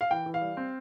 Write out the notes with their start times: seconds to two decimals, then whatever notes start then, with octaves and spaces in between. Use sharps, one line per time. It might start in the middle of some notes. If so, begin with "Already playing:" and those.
0.01 F5
0.11 E3 G5
0.26 E3
0.34 F5
0.41 G3
0.57 C4